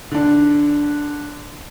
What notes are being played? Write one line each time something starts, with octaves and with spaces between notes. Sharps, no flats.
D3 D4